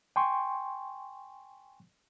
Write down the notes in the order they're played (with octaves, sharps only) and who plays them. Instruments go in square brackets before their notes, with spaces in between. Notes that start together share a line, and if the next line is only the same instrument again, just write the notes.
[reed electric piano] G5 G#5 C6 C#6